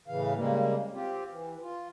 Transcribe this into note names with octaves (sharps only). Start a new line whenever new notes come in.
A2 C#3 E3 F5
C#3 G3 G#3 A#3
C4 F4 G4
E3
F4